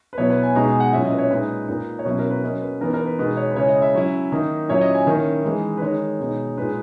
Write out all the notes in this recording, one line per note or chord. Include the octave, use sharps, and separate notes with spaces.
B4
B2 F#3 B3 E4 C#5
B4
G#5
B2 G#3 D#4 A#5
G#5
F#5
A#2 F#3 C#4 E4 E5
D#5
B4
C#5
A#2 G#3 D#4 B4
A#2 A#3 D#4
C#5
B2 F#3 C#4 E4 B4
A#4
B4
F#3 A#3 C#4 D#5
B4
E3 B3 D#4 A#4
A#4
B4
B2 G#3 B3 D#4 B4
C#5
B4
C#3 G#3 C#4 E4 C#5
D#5
E5
F#3 C#4 E4
D#3 A#3 D#4
A#2 F#3 C#4 E4 C#5
D#5
G#5
D#3 A#3 C#4 E4
E3 G#3 D#4
B4
D#3 G#3 D#4 C#5
B2 G#3 D#4
A#2 G#3 D#4 B4